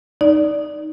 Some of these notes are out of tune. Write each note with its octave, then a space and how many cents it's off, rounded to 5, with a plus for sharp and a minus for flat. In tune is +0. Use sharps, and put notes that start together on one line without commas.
D#4 +0 D5 +0